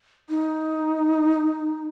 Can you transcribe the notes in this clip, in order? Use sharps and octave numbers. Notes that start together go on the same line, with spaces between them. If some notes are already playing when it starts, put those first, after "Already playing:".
D#4